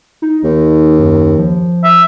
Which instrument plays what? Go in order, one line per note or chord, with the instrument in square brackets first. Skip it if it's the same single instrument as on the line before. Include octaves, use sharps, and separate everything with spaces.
[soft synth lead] D#4
[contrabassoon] D#2 [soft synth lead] D#4
[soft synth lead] F#2
F3
[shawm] E5